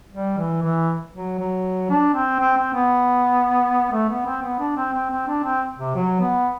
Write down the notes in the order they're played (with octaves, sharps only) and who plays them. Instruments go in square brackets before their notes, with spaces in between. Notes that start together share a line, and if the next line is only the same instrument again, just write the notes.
[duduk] G3
E3
E3
F#3
F#3
D4
C4
C4
C4
B3
A3
B3
C4
B3
D4
C4
C4
C4
D4
C4
C3
F#3
B3